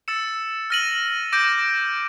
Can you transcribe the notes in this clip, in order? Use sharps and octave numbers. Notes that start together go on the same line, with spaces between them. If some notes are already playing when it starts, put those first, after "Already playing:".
E6 A6 C#7 E7
F6 A#6 D#7 F#7
D6 G6 A#6 D7